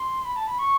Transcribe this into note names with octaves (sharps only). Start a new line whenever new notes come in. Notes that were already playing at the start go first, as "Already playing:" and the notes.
Already playing: C6
B5
A5
B5
C#6